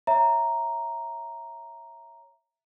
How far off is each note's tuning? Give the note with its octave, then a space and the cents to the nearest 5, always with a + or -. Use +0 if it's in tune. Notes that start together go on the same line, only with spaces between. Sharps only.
C#5 +0 E5 +5 A#5 +0